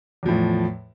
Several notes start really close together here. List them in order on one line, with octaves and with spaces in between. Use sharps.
E2 F3 A2